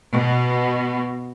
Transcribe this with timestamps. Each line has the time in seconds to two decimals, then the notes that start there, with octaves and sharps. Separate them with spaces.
0.12 B2